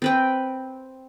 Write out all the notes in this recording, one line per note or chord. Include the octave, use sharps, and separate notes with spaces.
C4 B4 G5